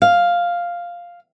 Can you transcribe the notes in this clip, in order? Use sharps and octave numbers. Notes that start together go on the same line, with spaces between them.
F5